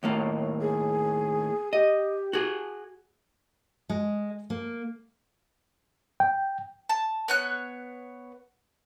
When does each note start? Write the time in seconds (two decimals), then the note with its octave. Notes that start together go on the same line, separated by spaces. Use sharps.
0.03 D#2 A2 A#3
0.61 G#4
1.73 G4 D#5
2.33 F#4 G#4
3.90 G#3
4.50 A#3
6.20 G5
6.89 A5
7.28 B3 C#5 F#6